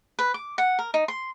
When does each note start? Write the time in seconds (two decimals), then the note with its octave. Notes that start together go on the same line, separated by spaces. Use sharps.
0.19 B4
0.34 D6
0.58 F#5
0.79 A#4
0.94 D#4
1.08 C6